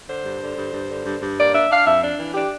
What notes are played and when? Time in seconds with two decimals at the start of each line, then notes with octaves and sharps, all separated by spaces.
0.08 D3 C5
0.25 G2
0.41 D3
0.57 G2
0.73 G2
0.89 D3
1.05 G2
1.21 G2
1.37 A#3 D5
1.54 D4 E5
1.70 D4 F5
1.86 F2 E5
2.01 D4
2.18 E3
2.34 D4 G4